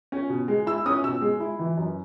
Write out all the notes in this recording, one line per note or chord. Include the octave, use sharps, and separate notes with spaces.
C#4
B2
G#3
E4 E6
C#4 D#6
B2 E6
G#3
E4
E3
F#2